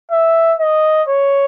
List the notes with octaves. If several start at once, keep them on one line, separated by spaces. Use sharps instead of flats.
E5
D#5
C#5